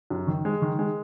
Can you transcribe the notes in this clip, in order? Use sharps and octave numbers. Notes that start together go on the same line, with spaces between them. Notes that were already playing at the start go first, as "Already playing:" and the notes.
F#2
D#3
G#3
D#3
G#3